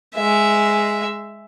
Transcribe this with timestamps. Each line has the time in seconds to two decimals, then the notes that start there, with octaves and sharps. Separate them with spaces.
0.15 G#3 E5